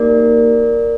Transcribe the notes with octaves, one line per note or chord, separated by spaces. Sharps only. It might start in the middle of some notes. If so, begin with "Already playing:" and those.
Already playing: A#3 D#4 G4 A#4 D5